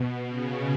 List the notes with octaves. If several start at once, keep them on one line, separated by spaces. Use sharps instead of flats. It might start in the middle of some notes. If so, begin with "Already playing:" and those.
Already playing: B2
C#3